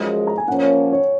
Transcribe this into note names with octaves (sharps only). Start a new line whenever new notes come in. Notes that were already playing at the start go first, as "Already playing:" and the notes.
Already playing: F#2 F3 G#3
A#5
G#5
A#2 F3 A#3 C#4 F#5
C#5
C#5